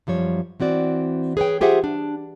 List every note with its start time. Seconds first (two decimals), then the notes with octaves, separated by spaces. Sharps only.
0.07 F#2 F3 G3 C#5
0.60 E3 C4 F#4 D5
1.37 G#4 B4 C#5 G5
1.61 F4 G4 G#4 C5 E5 F#5
1.84 D4